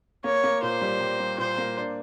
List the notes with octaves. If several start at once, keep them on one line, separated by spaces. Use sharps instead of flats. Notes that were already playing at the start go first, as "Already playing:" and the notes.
A#3 C#5
A#3
A#2 C5
G3
G3
G3
A#2 C5
A#3
D4